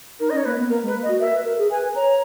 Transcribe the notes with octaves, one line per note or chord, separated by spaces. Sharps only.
D#4 A#4
C#4 D#5
C#5
A#3 B4
B3
A#3 A#4
G#3
B4
A#3
D#5
F#4
A#4 E5
B4
A#4
G#4
B4 G#5
C#5 A#5